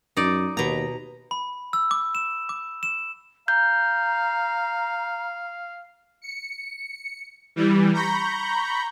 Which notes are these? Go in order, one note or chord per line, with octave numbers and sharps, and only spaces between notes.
F#2 D#4 D5
D#2 B2 A#5
B5
E6
D6
E7
D6
E7
F5 A#5 G6
C#7
E3 G3
A#5 B5 C#6 G6